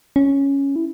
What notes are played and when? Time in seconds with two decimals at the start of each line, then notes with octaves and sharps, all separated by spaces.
0.16 C#4
0.76 E4